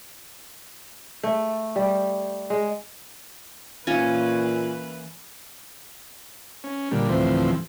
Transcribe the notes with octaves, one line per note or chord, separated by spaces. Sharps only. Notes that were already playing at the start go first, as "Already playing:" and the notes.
A3
G3
G#3
A#2 E3 A#3 C#4 F4 B4
C#4
A#2 D3 G3
D2 A2 E3 F3 C4